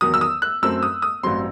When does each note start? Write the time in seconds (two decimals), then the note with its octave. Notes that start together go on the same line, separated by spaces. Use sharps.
0.01 E2 D#3 F#3 D#6
0.14 E6
0.21 D#6
0.42 F#6
0.62 F#2 F#3 A3 C4 E6
0.83 D#6
1.02 D#6
1.23 A1 G2 F#3 C4 C6